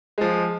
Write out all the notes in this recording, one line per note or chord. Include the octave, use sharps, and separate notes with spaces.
F3 G#3